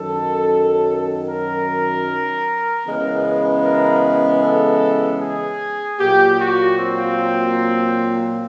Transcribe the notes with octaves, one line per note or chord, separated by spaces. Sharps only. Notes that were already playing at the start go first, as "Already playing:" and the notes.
Already playing: F#2 D#3 F#3 A4
A#4
C#3 E3 G#3 B3
A#4
A4
G#4
A#2 F#3 A#3 G4
F#4
C4